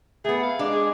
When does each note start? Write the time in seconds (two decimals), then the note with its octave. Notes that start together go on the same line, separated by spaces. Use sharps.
0.25 A3 B3 G#4
0.43 F5
0.59 G#3 D4
0.73 G#4